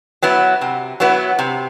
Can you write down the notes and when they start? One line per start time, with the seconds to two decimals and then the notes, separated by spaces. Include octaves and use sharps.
0.22 F#3 B3 E4
0.61 C3
1.00 F#3 B3 E4
1.39 C3